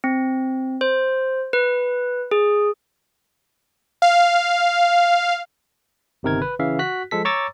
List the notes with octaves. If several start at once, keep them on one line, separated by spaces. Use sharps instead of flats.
C4
C5
B4
G#4
F5
G1 C3 D#3 A#4 G#6
B4
C#3 E3 E5 F5
F#4 F#6 B6
F3 G#3 A4 B6
C#5 A#5 C#6 D6 E6 A6